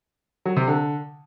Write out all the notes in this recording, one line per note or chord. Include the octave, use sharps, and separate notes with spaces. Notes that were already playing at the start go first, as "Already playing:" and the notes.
F#3
C3
D3